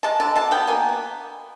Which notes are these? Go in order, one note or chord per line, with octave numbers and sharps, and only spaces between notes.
G#3 A5
D3 A5
B2 A5
B3 G5
A#3 G#5